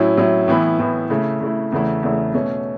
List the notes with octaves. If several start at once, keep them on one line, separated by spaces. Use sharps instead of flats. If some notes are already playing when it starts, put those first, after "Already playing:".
Already playing: A2 F#3 C#4 E4
A2 F#3 C#4 E4
A2 E3 B3 E4
A2 E3 B3 E4
C#3 A3 E4
C#3 A3 E4
E2 C#3 A3 E4
E2 C#3 A3 E4
B2 A3 C#4